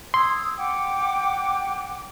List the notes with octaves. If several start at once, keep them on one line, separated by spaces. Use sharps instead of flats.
C6 D#6 E6 G#6
F#5 G5 D6